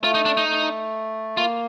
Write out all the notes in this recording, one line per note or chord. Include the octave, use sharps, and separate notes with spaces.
A3 F4
D#4
D4
D#4
A3
A#3 F4